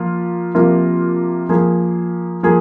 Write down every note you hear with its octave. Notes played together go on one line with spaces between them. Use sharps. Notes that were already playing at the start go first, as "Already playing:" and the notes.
Already playing: F3 A#3 F4
C3 F3 A#3 F4 A#4
F3 A#3 G#4
F3 A#3 G#4